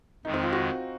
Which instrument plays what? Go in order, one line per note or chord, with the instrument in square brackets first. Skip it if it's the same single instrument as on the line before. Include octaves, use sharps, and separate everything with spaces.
[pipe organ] F2 D#3 G#3 [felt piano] D#4
[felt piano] C4
F4
F#4